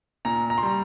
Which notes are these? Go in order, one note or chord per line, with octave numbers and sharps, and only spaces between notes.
A#2 A#5
A#5
C6
G3 A#5